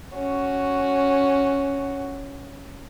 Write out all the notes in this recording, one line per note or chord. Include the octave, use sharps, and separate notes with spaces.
C#4 F#4